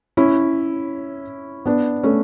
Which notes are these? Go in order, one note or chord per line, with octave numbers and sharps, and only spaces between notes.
C#4 E4
B3 D4
A3 C#4